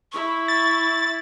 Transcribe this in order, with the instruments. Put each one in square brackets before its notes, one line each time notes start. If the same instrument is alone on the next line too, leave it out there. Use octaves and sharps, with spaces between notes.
[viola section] E4 [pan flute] C#6
[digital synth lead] A6